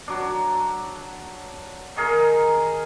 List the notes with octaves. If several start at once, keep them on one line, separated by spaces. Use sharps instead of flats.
F#3 D4
D#3 G#4 A#4